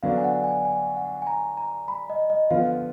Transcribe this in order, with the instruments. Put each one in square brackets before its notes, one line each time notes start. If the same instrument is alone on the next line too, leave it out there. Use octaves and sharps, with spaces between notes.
[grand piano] D3 F#3 B3 D4 [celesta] F5
[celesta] G#5
F#5
G#5
G#5
F#5
G#5
A#5
A#5
B5
D#5
D#5
[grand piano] D3 F3 B3 F4 [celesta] F5